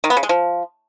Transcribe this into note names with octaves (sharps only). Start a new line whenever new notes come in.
D#3
B3
C#3
G#3
F3